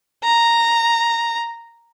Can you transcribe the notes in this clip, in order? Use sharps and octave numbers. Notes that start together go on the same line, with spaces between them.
A#5